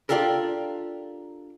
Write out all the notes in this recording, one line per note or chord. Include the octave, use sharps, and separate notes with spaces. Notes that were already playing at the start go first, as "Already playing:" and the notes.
D4 F4 G4 A4 A#4